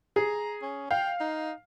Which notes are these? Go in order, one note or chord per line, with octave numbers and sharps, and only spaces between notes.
G#4 A#5
C#4
F5 G5
D#4